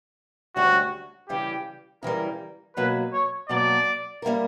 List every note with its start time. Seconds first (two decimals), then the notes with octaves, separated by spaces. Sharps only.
0.56 D2 D3 G3 C#4 F#4
1.29 C#3 E3 G3 G4
2.03 C#3 E3 G3 A#4
2.76 B2 F#3 A#3 B4
3.13 C#5
3.49 B2 F#3 A#3 D5
4.22 G3 A#3 E4 A#4